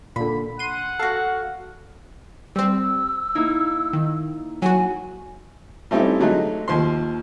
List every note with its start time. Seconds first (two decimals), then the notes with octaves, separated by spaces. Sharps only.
0.16 A#2 D3 B5
0.59 F#5 C6 D#7
0.99 F#4 A4 F5
2.56 G3 C4 E6
3.35 A#3 D#4 E4
3.93 D#3
4.62 F#3 F#4 G#5
5.91 G3 A3 C4 C#4 D#4 E4
6.20 D3 F#3 G#3 A3 D#4
6.68 D#2 F3 C6